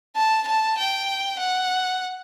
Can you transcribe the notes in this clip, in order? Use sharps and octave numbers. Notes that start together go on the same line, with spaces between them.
A5
A5
G5
F#5